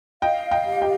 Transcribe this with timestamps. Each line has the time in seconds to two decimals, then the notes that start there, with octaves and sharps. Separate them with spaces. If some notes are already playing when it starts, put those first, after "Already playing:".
0.22 D#5 F5 G5
0.51 D#5 G5
0.66 G4
0.82 D#5 G5